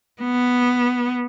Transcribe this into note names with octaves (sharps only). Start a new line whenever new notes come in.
B3